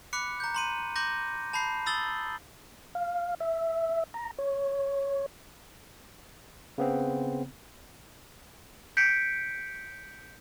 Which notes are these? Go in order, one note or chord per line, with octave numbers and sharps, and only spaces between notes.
B5 D6 F#6 B6 C#7
A#5 G6
A#5 C6 D#7
A#5 C6 D6 G6 A#6
A5 B5 G6 C7
B5 D#6 E6 A6 F#7 G7
F5
E5
A#5
C#5
C#3 B3 C4
G6 B6 C#7 D7